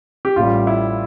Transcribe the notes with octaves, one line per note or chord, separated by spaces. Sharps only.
G4
A1 A2 G3 F4
E4